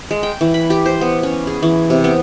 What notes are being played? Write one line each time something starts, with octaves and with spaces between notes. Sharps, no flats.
G#3
G5
E3
B5
G4
C5
B3
C#4
G#4
E3
C3
B3